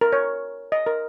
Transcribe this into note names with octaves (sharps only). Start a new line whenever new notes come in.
A#4
C#5
D#5
A#4